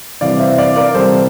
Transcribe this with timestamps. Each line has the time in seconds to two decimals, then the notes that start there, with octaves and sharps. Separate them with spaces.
0.21 C3 E3 G3 D5 F5
0.39 C5 E5
0.58 D5 F5
0.76 A#4 D5
0.95 C3 E3 G3 A4 C5